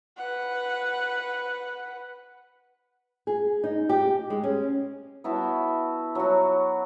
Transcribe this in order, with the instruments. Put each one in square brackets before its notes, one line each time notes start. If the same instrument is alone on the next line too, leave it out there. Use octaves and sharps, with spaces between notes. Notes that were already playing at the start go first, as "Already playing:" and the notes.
[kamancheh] B4 F#5
[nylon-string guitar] G#4
D#4
G4
G#3
C#4
[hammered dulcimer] B3 E4 F#4 A5
F#3 F#4